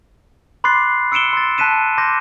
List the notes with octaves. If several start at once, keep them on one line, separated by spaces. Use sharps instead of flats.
B5 C6 D6 F#6 A6 C7
E6 C#7 D7 E7 G7
C6 A6
A5 F#6 B6 D#7 E7
C6 D6 G6 A#6